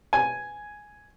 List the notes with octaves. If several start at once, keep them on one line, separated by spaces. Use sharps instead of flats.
G#5